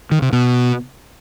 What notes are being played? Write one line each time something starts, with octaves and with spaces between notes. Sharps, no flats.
D#3
C3
B2